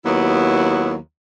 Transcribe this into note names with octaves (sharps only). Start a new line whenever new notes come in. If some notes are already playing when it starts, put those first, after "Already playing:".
D#2 F#3 B3 E4